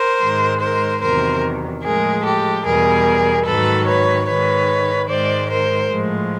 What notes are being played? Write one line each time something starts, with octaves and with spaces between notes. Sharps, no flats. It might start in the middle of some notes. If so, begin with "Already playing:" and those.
Already playing: A#4 C5
G#2 D#3 G#3
A#4 C5
E2 C3 D#3 F#3 A#4 C5
A2 F3 G#3 G#4 A#4
G4 A4
E2 B2 G3 G#4 A#4
G#2 D#3 F#3 A4 B4
B4 C#5
G#2 D#3 G#3 B4 C#5
G#2 D#3 G#3 C5 D5
A#4 C5
A2 F3 G#3